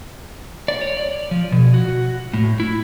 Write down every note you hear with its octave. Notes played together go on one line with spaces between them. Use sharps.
D5
C#5
D5
F3
B2
F#4
A2
E4